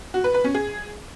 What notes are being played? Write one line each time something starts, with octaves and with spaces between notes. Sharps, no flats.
F#4
B4
B4
C#4
G#4